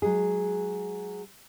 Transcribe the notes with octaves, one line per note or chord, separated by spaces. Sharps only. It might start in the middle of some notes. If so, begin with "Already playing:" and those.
F#3 G#3 G#4